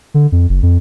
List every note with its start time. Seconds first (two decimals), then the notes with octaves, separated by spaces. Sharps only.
0.14 D3
0.32 F2
0.49 F#1
0.63 F2